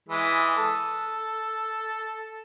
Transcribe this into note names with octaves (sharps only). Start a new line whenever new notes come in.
E3 G#3
A4